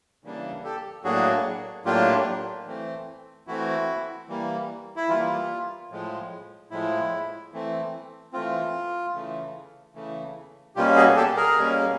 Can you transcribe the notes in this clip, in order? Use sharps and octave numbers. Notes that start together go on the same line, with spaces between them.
C#3 E3 G3 A#3 D4
G4 A4
A2 F#3 A#3 D4 F#4 G#4
A2 F#3 A#3 D4 F4 G4
E3 A3 C4
E3 A3 C4 E4 F#4
E3 G3 A#3
E4
E3 G3 A#3 F4
A2 F3 G#3
A2 F3 G#3 E4
E3 A3 C4
E3 A3 C4 F4
C#3 E3 A3
C#3 E3 A3
B2 G3 A#3 C#4 F4 G4
F#4 G#4
G4 A4
G#4 A#4
B2 G3 A#3 C#4